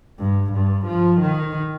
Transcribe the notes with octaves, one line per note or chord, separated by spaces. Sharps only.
G2
G2
F3
D#3